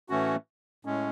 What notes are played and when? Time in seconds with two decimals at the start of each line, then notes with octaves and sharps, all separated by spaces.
0.09 A2 E3 A3 C#4 F#4
0.85 A2 G#3 C#4